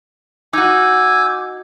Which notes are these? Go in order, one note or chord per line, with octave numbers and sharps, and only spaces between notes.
D#4 F#4 G#5 D6 E6 G6